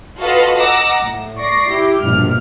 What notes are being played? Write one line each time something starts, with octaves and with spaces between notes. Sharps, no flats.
F4 F#4 A4 B4 D#5 F5
D#5 F#5 A#5 D6 E6 A#6
A2
D5 C#6 A#6 C7
E4 G4
A#1 G2 B2 F6